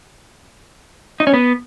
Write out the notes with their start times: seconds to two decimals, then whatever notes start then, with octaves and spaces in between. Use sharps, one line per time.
1.20 D#4
1.27 C#4
1.34 B3